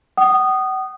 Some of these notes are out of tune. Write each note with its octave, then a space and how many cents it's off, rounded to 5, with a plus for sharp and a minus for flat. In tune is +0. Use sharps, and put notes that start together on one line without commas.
F#5 +40 D#6 -15